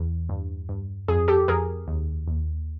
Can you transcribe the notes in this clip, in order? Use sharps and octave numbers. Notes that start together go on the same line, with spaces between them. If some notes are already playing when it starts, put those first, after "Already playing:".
Already playing: E2
G2
G2
F2 G#4
G4 A4
F2 G#4 A#4
D#2
D#2